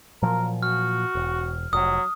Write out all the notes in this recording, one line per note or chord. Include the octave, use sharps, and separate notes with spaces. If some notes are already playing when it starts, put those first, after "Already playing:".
A#2 F3 F#3 A#4
F#4 F6
E1
F1 F#3 D#6